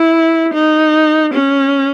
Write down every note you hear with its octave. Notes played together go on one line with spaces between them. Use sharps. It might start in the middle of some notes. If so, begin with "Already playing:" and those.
Already playing: E4
D#4
C#4